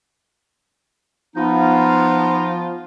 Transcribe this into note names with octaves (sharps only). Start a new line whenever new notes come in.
F3 B3 D#4 F4